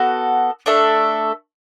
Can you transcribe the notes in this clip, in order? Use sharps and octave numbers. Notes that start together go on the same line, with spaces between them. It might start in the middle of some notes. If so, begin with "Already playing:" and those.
Already playing: B3 F#4 A4
A3 D4 A4 E5